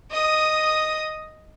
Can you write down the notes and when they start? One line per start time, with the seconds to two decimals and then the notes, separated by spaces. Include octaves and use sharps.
0.11 D#5 D#6